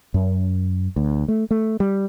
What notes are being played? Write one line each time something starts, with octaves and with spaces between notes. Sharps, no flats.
F#2
D2
A3
A3
G3